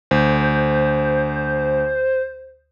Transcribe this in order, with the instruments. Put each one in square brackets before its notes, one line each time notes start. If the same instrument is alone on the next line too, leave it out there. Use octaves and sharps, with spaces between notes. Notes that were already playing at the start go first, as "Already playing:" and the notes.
[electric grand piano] D2 [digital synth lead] C5